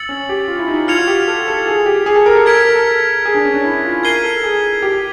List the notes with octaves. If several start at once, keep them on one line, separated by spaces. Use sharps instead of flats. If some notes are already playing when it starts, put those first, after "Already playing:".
Already playing: E6 A6 C#7 F#7
C#4
G4
F4
E4
D#4
F4 F6 G#6 C#7 F7
F#4
G4
A4
A4
G#4
G4
G#4
A4
A#4
A4
A#4 F6 G#6 B6 D7
A4
A#4
A4
G#4
D4
C#4
D4
E4
F4
A#4 G#6 C7 D#7 G7
A4
G#4
G4